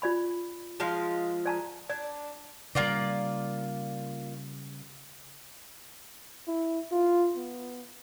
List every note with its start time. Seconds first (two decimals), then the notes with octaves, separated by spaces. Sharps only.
0.02 F4 D5 B5
0.80 F3 G#3 F5
1.46 D5 A5 A#5
1.89 D4 D5
2.75 C#3 G3 A#3 F4 D5
6.47 E4
6.91 F4
7.36 B3